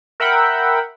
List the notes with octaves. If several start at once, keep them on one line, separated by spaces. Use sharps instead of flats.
A#4 E5 F#5 G5 B5